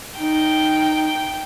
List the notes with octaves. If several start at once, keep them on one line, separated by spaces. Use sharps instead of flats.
D#4 G5